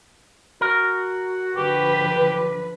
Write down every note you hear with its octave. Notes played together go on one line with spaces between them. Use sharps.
F#4 A#4
D3 F3 G4 B4